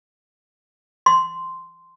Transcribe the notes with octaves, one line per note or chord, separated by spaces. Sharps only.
C6